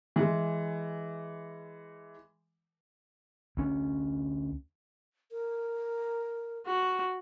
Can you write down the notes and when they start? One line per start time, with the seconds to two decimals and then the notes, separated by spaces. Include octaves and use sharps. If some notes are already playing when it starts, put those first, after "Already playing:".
0.16 E3 G#3
3.57 D2 C#4
5.32 A#4
6.66 F#4